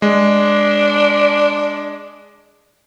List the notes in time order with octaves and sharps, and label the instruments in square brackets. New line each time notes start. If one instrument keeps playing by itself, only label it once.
[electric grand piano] G#3 [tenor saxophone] D4